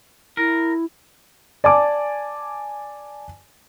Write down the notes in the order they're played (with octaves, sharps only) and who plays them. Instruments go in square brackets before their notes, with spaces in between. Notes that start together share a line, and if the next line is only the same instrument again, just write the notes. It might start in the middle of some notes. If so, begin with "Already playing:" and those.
[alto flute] E4 [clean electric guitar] A#4
[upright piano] D5 G#5 A5 D6